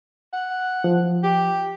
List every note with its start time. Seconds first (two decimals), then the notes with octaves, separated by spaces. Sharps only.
0.33 F#5
0.84 F3
1.23 G4